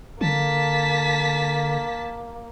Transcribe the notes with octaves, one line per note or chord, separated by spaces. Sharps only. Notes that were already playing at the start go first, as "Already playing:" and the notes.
D3 A#3 A5 B6